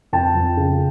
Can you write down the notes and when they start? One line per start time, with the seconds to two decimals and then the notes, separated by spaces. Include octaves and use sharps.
0.13 F2 G5 A5
0.35 F2
0.57 C#3